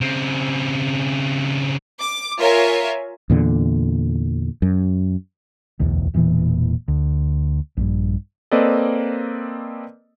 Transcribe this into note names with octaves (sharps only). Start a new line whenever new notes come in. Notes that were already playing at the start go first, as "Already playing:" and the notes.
C#3 C4
D6
F4 A#4 C#5 E5 G#5
E2 A#2 D3
F#2
D1 B1 E2
E1 A#2 E3
D2
A#1 G2
A#3 C4 A4 B4 D5 D#5